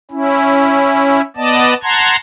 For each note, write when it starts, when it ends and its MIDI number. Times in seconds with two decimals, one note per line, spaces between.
0.11 1.21 61
0.11 1.21 64
1.37 1.74 59
1.37 1.74 74
1.37 1.74 75
1.37 1.74 81
1.83 2.16 78
1.83 2.16 81
1.83 2.16 82
1.83 2.16 84
1.83 2.16 92